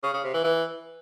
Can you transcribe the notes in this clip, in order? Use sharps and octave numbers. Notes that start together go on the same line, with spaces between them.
C#3
C#3
C3
E3
E3